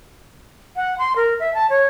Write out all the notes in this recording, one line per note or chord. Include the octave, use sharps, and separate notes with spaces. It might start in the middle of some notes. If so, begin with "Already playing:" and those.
F#5
C6
A#4
E5
A5
C#5